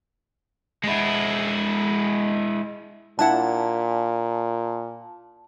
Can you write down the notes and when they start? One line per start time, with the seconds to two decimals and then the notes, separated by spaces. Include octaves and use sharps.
0.84 G#3 E4
3.19 A#2 D4 E4 F#5 A5